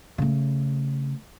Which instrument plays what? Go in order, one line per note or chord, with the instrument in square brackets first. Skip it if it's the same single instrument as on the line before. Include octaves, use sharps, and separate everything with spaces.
[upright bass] C#3 A3